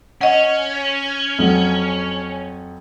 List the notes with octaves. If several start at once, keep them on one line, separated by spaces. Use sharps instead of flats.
C#4 D#5 F#5
F2 F#3